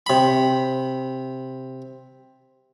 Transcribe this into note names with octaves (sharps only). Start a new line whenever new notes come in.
C3 B5